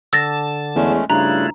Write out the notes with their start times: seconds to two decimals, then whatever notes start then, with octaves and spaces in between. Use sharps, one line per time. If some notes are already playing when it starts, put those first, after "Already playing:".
0.13 D3 A5 E6 A6 A#6
0.76 E2 G#3 A3 C#4
1.10 G2 C#3 A3 E4 F4 A#5 F#6